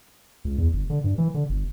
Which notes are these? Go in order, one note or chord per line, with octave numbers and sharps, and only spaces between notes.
C#2
E2
G1
D3
G2
E3
D3
G1